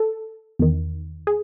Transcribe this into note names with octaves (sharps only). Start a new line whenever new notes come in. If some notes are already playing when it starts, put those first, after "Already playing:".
Already playing: A4
E2 D#3
G#4